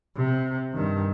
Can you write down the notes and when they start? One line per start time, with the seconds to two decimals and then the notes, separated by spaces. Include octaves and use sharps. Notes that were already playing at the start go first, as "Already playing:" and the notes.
0.16 C3
0.73 G2 D#3